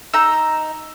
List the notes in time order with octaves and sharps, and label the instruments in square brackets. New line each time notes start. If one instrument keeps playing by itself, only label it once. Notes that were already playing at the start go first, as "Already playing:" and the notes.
[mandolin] D#4 A#5 [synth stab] E6